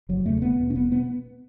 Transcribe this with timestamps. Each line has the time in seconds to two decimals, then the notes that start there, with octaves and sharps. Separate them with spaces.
0.09 F#1 F#3
0.26 E2 C#3 A3
0.42 E1 B3
0.59 E2 B2
0.70 C#4
0.75 E1 B3
0.91 B2 B3